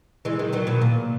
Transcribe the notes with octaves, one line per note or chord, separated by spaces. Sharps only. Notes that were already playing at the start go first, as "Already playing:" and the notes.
E3 G#3
D#3 F#3
D#3 F#3
B2 D#3
A#2